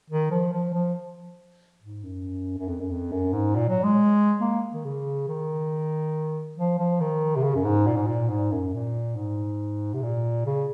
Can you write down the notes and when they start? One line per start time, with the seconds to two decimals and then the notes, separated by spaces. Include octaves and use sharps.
0.10 D#3
0.31 F3
0.53 F3
0.74 F3
1.82 G#2
2.03 F#2
2.58 F#2
2.68 F2
2.80 F#2
2.90 F2
3.11 F#2
3.33 G#2
3.55 A#2
3.69 F#3
3.84 G#3
4.41 A#3
4.73 D#3
4.85 C#3
5.27 D#3
6.58 F3
6.79 F3
7.00 D#3
7.36 C3
7.43 C#3
7.55 F#2
7.64 G#2
7.86 A#2
7.97 G#2
8.07 A#2
8.29 G#2
8.52 F#2
8.73 A#2
9.15 G#2
9.94 C3
10.02 A#2
10.46 C#3